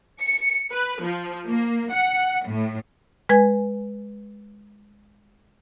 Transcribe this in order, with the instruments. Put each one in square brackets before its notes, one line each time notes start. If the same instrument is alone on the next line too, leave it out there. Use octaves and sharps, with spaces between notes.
[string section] C#7
B4
F3
A#3
F#5
A2
[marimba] G#3 B4 G#5 G#6